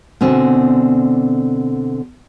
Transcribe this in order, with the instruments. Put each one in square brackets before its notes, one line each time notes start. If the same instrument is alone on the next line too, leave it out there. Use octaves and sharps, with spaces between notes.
[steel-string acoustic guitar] B2 D3 C4 G#5